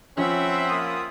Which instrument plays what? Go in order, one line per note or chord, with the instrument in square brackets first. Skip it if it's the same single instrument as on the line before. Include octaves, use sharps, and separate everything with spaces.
[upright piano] F3 C#4 [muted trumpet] C4 [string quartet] E5 F#5 B5
[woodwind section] A#3 F4 D#6